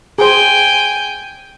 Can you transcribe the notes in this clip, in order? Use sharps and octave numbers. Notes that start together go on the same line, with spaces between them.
G#4 C5 G5 G#5